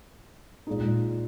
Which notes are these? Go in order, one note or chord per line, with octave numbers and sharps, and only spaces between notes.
A#2 G#3 D#4